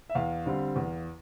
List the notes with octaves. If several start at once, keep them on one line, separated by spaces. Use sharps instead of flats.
E5
E2 F5
D3 G3 C4
E2